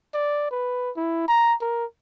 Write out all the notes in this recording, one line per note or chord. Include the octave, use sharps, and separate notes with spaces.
D5
B4
E4
A#5
A#4